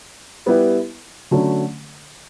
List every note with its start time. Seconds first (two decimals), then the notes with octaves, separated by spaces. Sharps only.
0.46 G3 B3 E4 G4 B4
1.31 D3 F#3 A3 C#4